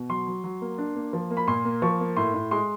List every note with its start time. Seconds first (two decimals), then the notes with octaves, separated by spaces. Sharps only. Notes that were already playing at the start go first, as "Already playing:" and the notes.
Already playing: B2
0.10 F#3 C6
0.27 F#3
0.44 F#3
0.61 A#3
0.78 D4
0.95 A#3
1.13 F3
1.30 A#3
1.37 B5
1.47 A#2 C6
1.65 A#3
1.82 F3 C#6
2.00 A#3
2.17 A2 C6
2.34 A2
2.51 G#3 C6